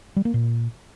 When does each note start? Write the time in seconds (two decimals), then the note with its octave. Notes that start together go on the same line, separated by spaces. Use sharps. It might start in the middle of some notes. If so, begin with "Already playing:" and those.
0.16 G3
0.25 A#3
0.34 A#2